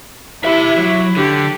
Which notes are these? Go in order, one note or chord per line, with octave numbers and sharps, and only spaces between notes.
E4 G4 E5
F#3
D3 G4